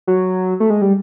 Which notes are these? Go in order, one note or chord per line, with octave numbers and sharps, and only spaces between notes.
F#3
A3
G#3
G3